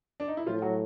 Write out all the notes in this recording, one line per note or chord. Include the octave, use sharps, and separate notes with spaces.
D4
D#4
E4
A2 F3 F4
F#3 F#4